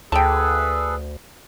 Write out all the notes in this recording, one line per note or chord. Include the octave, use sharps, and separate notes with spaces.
D2 G#4 A4 B4 G5 A5